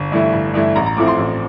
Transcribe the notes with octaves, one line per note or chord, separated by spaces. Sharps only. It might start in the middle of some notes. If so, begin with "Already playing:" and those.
Already playing: G1
G2 E3 A3 E4
G1
G2 E3 A3 E4
A1 A#5
A#5
A2 F3 A3 C4 D6
C6
A1